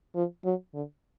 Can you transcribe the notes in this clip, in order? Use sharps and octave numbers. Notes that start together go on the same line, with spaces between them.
F3
F#3
D3